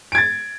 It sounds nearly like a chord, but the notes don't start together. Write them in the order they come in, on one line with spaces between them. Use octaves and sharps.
D7 G#6 A6